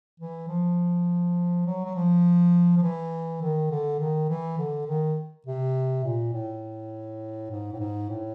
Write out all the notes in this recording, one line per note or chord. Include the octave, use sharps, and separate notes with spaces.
E3
F3
F#3
F#3
F3
F3
E3
D#3
D3
D#3
E3
D3
D#3
C3
A#2
A2
G#2
A2
G#2
A2